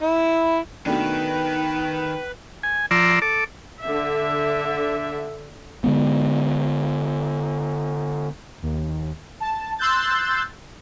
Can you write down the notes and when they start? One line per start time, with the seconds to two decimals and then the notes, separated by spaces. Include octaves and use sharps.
0.03 E4
0.86 B2 D#3 A3 D4 B4 G5
2.63 G#5
2.91 F3 D5 A#5 C6 E6
3.22 A4 D6
3.84 D3 E5
5.84 D3 G#3 B3
8.62 D#2
9.40 A5
9.78 C6 E6 F#6 G6 A6